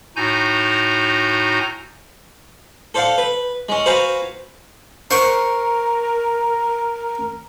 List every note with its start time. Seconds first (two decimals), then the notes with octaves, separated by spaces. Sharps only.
0.16 A2 D#4 F#4 G#5 A#5 G6
2.94 A4 C5 D5 F5 F#5
3.18 B4
3.69 G#3 C#4
3.86 F#4 B4 C5 F5 G#5 A#5
5.11 A#4 C5 F#5 A#5 C#6